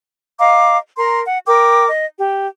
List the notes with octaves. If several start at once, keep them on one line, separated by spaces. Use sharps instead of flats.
D#5 F5 A#5 D6
A#4 A#5 C6
F#5
A#4 G5 D6
D#5
G4